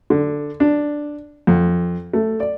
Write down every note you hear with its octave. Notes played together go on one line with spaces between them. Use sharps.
D3
D4
F2
A3
D5